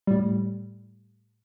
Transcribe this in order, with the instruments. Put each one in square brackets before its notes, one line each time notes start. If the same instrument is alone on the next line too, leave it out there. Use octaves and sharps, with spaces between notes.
[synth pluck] A2 G3